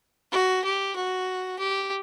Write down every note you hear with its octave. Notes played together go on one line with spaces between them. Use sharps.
F#4
G4
F#4
G4